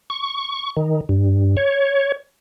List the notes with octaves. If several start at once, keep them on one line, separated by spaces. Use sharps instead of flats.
C#6
D#3
G2
C#5